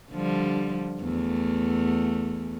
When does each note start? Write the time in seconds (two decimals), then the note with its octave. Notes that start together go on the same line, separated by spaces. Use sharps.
0.12 D3 F3 G3
1.01 E2 A3